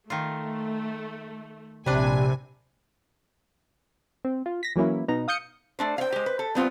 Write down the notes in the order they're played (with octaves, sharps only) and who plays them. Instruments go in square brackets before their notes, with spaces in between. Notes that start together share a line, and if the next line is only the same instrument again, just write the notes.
[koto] D#3 F4 [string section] A3
[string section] A#1 G#5 [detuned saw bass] C3 [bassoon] G3 [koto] D4 B4
[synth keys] C4
F4
A#6 B6
E3 F#3 A#3 C#4 E4
B2 B3 D#4 A#5
F5 D#6 G6 C#7
[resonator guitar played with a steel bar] A3 D4 C5
[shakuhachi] C5 [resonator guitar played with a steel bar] F5 G5
[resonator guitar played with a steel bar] G#3 G4
B4
A4
[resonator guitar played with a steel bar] G3 B3 F4 [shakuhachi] C4